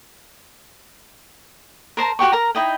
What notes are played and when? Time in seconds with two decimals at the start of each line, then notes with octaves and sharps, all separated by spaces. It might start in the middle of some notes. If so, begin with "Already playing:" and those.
1.97 A#4 C5 A5 A#5
2.19 F#4 G4 G5 C#6
2.32 A#4 A#5
2.55 D#4 E4 D#5 G5